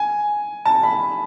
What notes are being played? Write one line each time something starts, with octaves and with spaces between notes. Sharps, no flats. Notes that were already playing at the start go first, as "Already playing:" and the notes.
Already playing: G#5
A5
B5